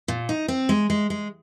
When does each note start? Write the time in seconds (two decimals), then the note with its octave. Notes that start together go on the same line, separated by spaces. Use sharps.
0.08 A#2
0.29 D#4
0.48 C4
0.69 G#3
0.90 G#3
1.10 G#3